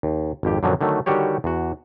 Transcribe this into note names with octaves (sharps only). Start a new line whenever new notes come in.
D#2
G#1 F2 G4
F#2 A#2 D3 F3 F#3
D3 D#3 F#3 A3
D3 D#3 G3 F#4 G4 C#5
E2 F#4